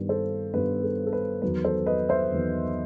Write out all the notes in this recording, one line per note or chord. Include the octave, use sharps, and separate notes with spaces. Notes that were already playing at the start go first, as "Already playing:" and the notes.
Already playing: G2 D#3 G3 B3
A4 C5
G2 D#3 G3 B3 B4
A4
A4
B4
E2 D#3 F#3 B3 B4
A4 C5
B4 D#5
C5 E5
E2 D#3 F#3 B3